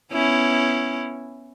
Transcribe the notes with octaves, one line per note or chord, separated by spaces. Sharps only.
B3 C#4 E4